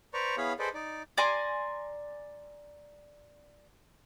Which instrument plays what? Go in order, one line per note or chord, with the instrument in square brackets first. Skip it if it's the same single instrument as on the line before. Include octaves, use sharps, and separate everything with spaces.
[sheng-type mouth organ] B4 C5 D5 A#5 C#6
B3 E4 G#4 C#5 F5 B5
G#4 A4 B4 C5 D5 D#5
D#4 D5
[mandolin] D5 G#5 A#5 C6